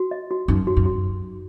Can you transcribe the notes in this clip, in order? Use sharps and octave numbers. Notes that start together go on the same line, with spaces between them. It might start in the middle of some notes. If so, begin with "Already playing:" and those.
Already playing: F#4
D#5
F#4
F#2 D#4
F#4
F#2
F#4